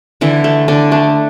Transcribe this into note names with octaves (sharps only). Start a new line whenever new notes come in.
D3 E3 E4
A3
D3 D4
A3 D4